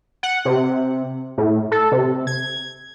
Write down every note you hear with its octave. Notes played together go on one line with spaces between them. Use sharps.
F#5
C3
A2
A4
C3
G#6